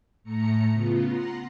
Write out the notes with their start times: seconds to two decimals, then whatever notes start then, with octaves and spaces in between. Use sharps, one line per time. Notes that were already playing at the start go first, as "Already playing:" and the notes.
0.24 A2 A3 A#5 C#7
0.72 C#3 B3 F4
1.07 F#5 A#5 C6